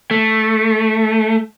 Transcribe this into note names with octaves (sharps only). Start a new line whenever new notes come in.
A3